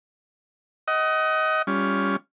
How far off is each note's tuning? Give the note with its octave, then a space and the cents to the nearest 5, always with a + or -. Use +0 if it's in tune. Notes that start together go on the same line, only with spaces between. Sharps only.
D#5 +15 F#5 +40
G3 +15 C#4 +15 F4 +0